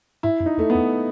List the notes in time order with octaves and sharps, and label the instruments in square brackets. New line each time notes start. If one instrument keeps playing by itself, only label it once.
[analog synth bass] G#2 [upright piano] E4
[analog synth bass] F#2
[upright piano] D#4
[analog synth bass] E2 [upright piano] A3
[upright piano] B3
[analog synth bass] E2